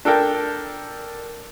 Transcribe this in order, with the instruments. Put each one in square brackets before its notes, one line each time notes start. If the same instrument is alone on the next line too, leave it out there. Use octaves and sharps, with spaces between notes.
[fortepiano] D4 A4 A#4 G5